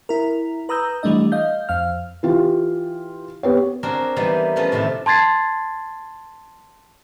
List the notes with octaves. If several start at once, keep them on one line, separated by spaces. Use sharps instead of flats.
E4 A#4
B4 A#5 D#6 E6 G6
E3 G3 A3 D4 D#5
D#5 F5 G6
F2 F5 F6
E3 F4 G4
B3 G4 C#5
C4 D4 F#4 G#4 A#4
E3 G3 A#3 B3 D#4
F3 A3 B3 C#4
A2 C3 D#3 E4
A5 C6 G#6 A6 C7